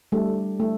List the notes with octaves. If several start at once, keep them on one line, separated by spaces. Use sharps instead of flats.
G3 A3 D4 A4
A3